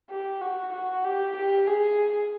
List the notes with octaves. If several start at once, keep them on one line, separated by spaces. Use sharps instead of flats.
G4
F#4
F#4
G4
G4
G#4